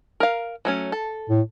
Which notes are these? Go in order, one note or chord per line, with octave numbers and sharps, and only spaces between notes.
A#4 F5
F#3 A3 C#4
A4
A2